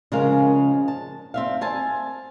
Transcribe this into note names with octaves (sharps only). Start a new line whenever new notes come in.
C#3 F3 G#3 C#4 A#4 F5
A5
C4 E5 F5
C5 G#5 A5